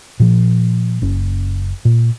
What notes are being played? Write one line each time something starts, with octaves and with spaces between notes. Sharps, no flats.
A#2 F3
F#1 C#4
A#2